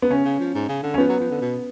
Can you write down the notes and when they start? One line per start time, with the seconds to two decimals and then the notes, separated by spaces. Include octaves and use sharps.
0.02 B3
0.11 C#3 C#4
0.25 C#3
0.40 F3
0.55 G#2
0.69 C#3
0.83 D3
0.94 C#4
0.98 F3 B3
1.09 F#3
1.20 F3
1.31 D3
1.41 B2